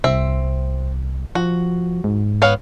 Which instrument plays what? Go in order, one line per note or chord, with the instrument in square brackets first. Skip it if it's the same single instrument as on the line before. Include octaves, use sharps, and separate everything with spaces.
[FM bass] C2 [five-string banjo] C4 E5
[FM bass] F3 [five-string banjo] F#4
[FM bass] G#2
[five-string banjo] B3 C#5 F5